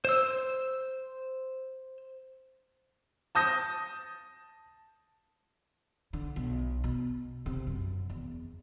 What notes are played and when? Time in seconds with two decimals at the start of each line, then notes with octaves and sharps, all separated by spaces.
0.05 C5 E6
3.35 A5 D#6 G6 A#6
6.13 D3
6.36 B1
6.84 B2
7.46 C3
7.67 F#2
8.10 E2